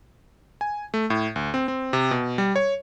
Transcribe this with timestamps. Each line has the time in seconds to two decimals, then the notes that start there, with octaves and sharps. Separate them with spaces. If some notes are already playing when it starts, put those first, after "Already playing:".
0.61 G#5
0.94 A3
1.10 A2
1.36 D2
1.54 C4
1.68 C4
1.93 C3
2.11 B2
2.38 G3
2.56 C#5